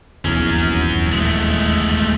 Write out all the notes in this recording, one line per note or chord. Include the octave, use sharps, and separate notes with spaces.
D#1 A#1 E2 F#3 C#4
G#3 A3